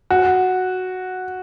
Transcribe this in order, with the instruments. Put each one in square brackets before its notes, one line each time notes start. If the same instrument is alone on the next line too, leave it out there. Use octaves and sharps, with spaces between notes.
[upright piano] F#4